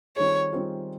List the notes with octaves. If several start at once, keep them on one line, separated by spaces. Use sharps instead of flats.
D#3 G3 C4 F4 G#4 C#5
D#3 G3 C4 F4 G#4